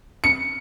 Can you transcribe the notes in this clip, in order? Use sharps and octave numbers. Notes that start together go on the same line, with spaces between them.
C#7